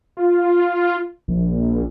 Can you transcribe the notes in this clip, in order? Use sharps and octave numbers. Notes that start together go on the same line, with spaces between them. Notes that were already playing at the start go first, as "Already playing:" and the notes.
F4
A#1